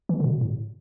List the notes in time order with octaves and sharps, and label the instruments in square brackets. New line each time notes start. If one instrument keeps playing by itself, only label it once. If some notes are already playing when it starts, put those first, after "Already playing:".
[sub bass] E3
D3
B2
A2